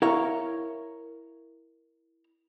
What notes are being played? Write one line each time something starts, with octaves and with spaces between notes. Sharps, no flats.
E4 A#4 C#5 F5